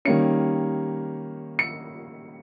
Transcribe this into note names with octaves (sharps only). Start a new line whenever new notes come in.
D#3 G3 A#3 C#4 C#7
C#7